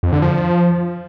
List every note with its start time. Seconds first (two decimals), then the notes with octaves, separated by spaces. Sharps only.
0.03 F2
0.13 D3
0.22 F3